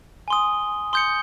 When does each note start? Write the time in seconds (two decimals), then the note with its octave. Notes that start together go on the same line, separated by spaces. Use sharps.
0.28 G#5 C6 D#6
0.93 C6 D#6 G6 C#7